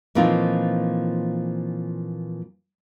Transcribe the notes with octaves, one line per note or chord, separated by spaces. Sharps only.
A#2 E3 F3 C4 D#4 F4